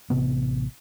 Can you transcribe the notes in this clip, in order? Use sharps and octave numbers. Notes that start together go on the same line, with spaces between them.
A1 C3 B3